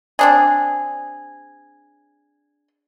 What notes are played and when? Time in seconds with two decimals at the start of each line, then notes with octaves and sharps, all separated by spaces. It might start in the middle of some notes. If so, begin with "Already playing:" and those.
0.19 C4 D4 G#4